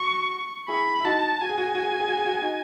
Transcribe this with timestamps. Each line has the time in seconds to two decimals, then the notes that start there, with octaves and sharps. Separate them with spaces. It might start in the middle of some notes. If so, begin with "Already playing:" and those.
Already playing: F#4 C#6
0.68 E4 G#4 B5
1.00 E4
1.04 D#4 F#4 A5
1.41 F#4 G#5
1.49 G#4
1.58 F#4
1.66 G#4
1.75 F#4
1.83 G#4
1.91 F#4
2.00 G#4
2.08 F#4
2.17 G#4
2.26 F#4
2.34 G#4
2.42 D#4 F#4